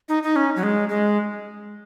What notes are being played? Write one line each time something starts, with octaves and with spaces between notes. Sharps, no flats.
D#4
D#4
C#4
F#3
G#3
G#3